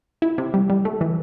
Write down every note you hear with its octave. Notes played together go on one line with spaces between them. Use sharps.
E4
C3
G3
G3
A3
E3